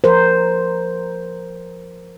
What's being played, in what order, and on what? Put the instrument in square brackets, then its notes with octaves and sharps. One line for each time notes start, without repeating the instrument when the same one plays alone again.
[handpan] F3 A#4 C5